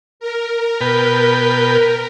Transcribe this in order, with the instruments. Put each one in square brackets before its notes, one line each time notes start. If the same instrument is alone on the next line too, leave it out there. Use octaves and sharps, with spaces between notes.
[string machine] A#4
[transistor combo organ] B2 B4 G5